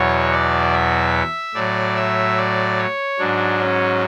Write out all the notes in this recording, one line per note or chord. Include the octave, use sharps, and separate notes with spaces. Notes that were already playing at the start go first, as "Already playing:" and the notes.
Already playing: E2 B2 F#3 C#5
D5
E5
A2 F#3 D5
E5
D5
C#5
G#2 F#3 D4
C#4